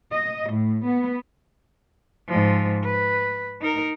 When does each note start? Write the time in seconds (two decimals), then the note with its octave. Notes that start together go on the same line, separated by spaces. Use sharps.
0.11 D#5
0.52 A2
0.85 B3
2.29 G#2 F3
2.84 B4
3.61 D#4 A#4